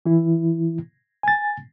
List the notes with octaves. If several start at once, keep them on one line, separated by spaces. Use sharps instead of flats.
E3 E4
G#5 A6